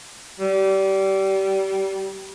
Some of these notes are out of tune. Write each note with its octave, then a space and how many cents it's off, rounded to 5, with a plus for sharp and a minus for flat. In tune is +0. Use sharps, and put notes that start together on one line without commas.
G3 -25